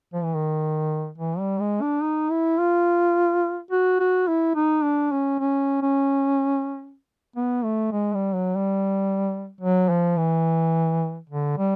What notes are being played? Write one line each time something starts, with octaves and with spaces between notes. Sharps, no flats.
F3
E3
D#3
E3
G3
G#3
D4
D#4
E4
F4
F#4
F#4
E4
D#4
D4
C#4
C#4
C#4
B3
A3
G#3
G3
F#3
G3
F#3
F3
E3
D3
G3